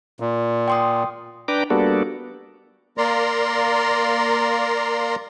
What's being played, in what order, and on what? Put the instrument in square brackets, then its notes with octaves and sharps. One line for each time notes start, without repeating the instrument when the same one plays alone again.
[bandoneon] A#2
[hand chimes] G5 C6 D#6
[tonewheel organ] D4 B4 G5 A#5 D6
G3 A#3 B3 D4 F#4 A4
[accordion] A#3 A#4 D5 A#5 C6